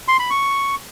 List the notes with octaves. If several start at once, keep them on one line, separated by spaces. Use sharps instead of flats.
C6
B5
C#6